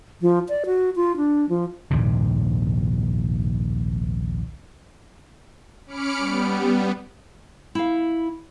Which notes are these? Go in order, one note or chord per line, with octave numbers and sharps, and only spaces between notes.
F3
D5
F#4
F4
D4
F3
A#1 D#2 G#2 C3
C#4 B5 D6 F6 C#7 D7
G3 B3
E4 F5